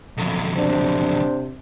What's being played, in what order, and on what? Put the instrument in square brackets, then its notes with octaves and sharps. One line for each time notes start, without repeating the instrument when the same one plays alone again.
[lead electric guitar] B1 F2
[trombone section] C3 D4 C5